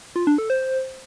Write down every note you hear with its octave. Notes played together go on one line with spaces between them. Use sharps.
F4
D4
A4
C5